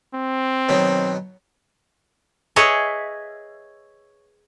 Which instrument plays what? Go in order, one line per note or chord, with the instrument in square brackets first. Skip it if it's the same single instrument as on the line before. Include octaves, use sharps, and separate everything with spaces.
[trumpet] C4
[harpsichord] B2 D#3 F#3
[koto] G#4 B4 C#5 D#5 E5